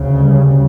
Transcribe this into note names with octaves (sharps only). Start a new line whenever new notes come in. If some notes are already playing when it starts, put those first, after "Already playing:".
Already playing: D2 C#3
G3